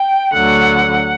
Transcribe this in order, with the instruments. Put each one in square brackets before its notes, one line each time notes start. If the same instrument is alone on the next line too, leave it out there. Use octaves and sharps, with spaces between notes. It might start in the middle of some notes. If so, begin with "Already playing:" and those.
Already playing: [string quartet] G5
D2 D3 F#3 F#5